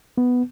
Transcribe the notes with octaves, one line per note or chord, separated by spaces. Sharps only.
B3